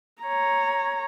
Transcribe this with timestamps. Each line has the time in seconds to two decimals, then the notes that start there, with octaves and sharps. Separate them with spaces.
0.22 C#5 A#5